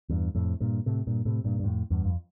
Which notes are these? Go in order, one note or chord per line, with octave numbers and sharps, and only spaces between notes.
E2 G2
F2 A2
G2 A#2
A2 C3
G2 A#2
A2 C3
G2 A#2
G2
F2 A2
E2 G2
F2